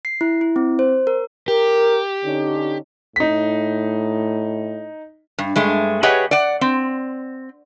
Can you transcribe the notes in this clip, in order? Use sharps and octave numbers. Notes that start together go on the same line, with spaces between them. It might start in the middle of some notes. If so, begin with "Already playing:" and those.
C7
E4
E4
C4
C5
A#4
G4 A#4
D3 C#4 D#4
A2 D#4 B6
G2
G2 G#3 A3
G4 G#4 B4 C#5 D#5 F#5
D5 F#5
C4